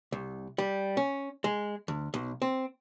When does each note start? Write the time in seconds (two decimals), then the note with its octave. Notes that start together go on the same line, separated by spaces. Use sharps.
0.12 C2
0.58 G3
0.97 C#4
1.44 G#3
1.88 D2
2.14 B1
2.42 C4